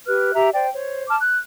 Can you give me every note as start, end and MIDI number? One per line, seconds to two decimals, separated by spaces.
0.06 0.31 67
0.06 0.31 71
0.06 0.31 89
0.06 0.31 90
0.34 0.49 67
0.34 0.49 76
0.34 0.49 82
0.53 0.67 72
0.53 0.67 74
0.53 0.67 79
0.72 1.05 72
0.72 1.05 73
1.08 1.16 81
1.08 1.16 86
1.08 1.16 89
1.20 1.38 90